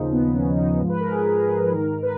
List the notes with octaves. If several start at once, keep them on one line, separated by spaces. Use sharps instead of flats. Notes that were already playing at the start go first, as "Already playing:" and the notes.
Already playing: D#2 C#3 F3 D#4
B3
C#4
D#4
G#2 F3
B4
A#4
G#4
G#4
G#2 D#3 A#4
B4